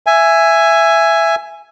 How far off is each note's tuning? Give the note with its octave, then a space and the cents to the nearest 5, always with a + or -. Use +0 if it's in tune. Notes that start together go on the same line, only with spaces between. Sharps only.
E5 +15 G#5 +0